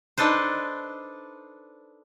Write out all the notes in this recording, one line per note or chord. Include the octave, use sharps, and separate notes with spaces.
D4 D#4 A4 B4 C5